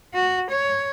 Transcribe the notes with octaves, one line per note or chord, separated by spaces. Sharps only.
F#4
C#5